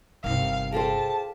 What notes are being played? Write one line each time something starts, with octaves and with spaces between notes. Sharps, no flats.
G1 C3 D#3 F5
F4 G#4 A4 C5 F5 G5 A5